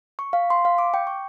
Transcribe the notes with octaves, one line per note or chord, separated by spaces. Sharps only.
C#6
F5
C6
F5
D6
G5
C#6